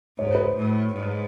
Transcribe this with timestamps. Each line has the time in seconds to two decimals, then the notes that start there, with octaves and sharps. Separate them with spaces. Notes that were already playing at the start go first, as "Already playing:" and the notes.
0.18 G#2 C#5
0.26 C5
0.35 B4
0.44 C5
0.56 A2
0.94 G#2